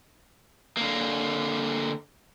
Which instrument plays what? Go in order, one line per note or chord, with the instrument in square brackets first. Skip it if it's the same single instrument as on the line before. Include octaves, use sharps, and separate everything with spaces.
[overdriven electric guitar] D3 A#3